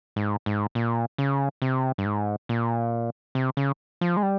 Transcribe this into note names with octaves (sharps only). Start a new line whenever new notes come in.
G#2
G#2
A#2
C#3
C3
G2
G#2
A#2
C3
C#3
F3
G#3
G3